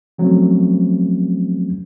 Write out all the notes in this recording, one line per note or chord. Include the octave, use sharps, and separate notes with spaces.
F3 F#3 A3 C4 C#4